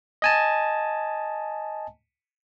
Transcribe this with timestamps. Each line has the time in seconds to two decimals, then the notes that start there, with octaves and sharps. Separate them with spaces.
0.22 D#5 G#5 A5